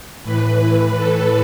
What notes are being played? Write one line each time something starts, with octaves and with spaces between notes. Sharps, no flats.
A2 E3 B4
A4